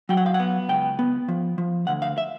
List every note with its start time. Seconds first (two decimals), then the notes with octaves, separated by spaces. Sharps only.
0.09 F#3 G5
0.17 F#5
0.26 F5
0.34 F#5
0.40 B3
0.69 C#2 G5
0.99 B3
1.28 F3
1.58 F3
1.87 D2 F#5
2.02 F5
2.18 E5